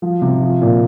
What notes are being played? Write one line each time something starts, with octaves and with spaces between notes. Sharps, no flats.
F3
C3
F3
A#2